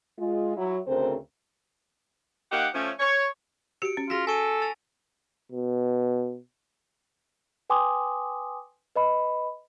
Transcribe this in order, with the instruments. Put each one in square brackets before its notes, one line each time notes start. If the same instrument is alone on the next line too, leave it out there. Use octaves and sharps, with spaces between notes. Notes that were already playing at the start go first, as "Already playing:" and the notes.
[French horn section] G#3 F4
F#3 E4
D2 C#3 C4 A4 A#4 C5
[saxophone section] A#3 D#4 G4 F#5
F3 A3 C#4
C#5
[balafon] F#4 G4 [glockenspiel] C#7 D7
[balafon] C#4
[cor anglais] F4 [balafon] F#4 G#4 [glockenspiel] A#6 B6
[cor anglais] A4 [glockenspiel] G#5 C#6 D#7
[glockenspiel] E6 A6 F7
[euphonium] B2
[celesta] B4 G5 G#5 C6 D6 D#6
B4 D#5 B5